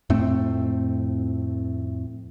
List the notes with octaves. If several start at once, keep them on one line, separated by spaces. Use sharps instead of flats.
F2 A2 A3 C4